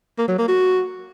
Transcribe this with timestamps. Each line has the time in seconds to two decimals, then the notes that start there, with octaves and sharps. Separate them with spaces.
0.18 A#3
0.28 F#3
0.38 A#3
0.48 F#4